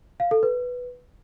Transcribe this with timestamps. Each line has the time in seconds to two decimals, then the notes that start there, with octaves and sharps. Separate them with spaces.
0.20 F5
0.31 A4
0.43 B4